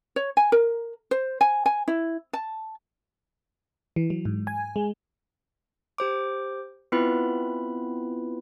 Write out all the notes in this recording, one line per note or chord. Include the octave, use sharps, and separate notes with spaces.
C#5
G#5
A#4
C5
G#5
G#5
E4
A5
E3
F#3
G#2
G#5
G#3
G4 C5 D6
B3 C4 E4 F4 B4 B5